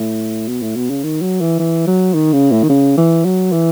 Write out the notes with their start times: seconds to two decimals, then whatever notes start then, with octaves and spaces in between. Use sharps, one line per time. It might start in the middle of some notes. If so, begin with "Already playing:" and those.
Already playing: A2
0.48 B2
0.62 A2
0.76 B2
0.90 C#3
1.04 D#3
1.21 F#3
1.41 E3
1.59 E3
1.87 F#3
2.14 D#3
2.33 C#3
2.52 A2
2.63 D#3
2.69 C#3
2.97 E3
3.25 F#3
3.52 E3